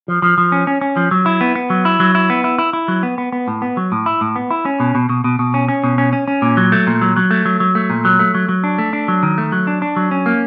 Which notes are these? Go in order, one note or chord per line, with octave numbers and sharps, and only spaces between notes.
F3
F3
F3
C#4
C#4
C#4
F3
F#3
E4
B3
B3
F#3
E4
F#3
E4
B3
E4
E4
E4
F#3
B3
B3
B3
A2
B3
F#3
A2
E4
A2
B3
E4
C#4
B2
B2
B2
B2
B2
C#4
C#4
B2
C#4
C#4
C#4
A#2
F#3
A3
A#2
F#3
F#3
A3
F#3
F#3
A3
A#2
F#3
A3
F#3
F#3
D4
A3
D4
F#3
D#3
A3
F#3
D4
D4
F#3
C#4
A#3